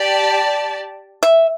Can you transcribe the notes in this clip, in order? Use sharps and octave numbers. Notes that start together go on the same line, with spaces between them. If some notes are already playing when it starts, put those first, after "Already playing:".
Already playing: G4 D5 A5
E5